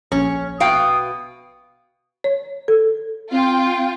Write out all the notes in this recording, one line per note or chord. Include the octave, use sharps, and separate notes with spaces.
A#1 C#4
B2 F5 G5 D#6
C#5
A4
C4 F4 G5